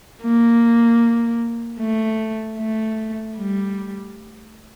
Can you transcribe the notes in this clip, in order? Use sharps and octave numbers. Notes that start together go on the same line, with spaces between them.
A#3
A3
A3
G3